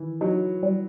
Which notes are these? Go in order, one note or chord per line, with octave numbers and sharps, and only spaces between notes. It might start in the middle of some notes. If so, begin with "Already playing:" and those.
Already playing: D#3 E3
F#3 D#4
G3